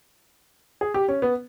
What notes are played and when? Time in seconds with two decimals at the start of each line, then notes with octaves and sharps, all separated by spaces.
0.81 G#4
0.94 G4
1.08 C#4
1.22 B3